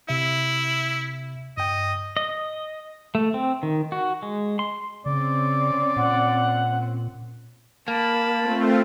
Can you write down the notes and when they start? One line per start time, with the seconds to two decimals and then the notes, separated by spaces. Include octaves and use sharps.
0.09 C3 E4 E5
1.57 G2 D#5 G5
2.17 D#5
3.15 A3
3.34 C4
3.63 D#3
3.92 F#4
4.23 G#3
4.59 C6
5.06 C#3 C4 C#4 D5
5.96 A#2 F#5
7.88 A#3 A5 B5
8.40 A3 C4 F4